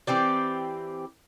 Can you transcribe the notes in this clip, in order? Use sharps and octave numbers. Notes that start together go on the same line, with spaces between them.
E3 C4 G4 D5